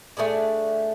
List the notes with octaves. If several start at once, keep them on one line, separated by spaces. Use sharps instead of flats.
A3 D4 G#4 D5